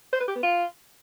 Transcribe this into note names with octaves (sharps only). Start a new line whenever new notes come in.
C5
B4
G4
B3
F4